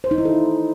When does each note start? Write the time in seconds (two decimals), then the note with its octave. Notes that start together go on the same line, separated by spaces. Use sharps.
0.04 C5
0.11 D#4
0.18 E4
0.25 A4